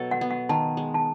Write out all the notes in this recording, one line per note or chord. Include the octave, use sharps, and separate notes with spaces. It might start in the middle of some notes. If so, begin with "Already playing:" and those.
Already playing: B2 F#3 A4
F#5
B3
F#5
D#3 A5
G#3
A5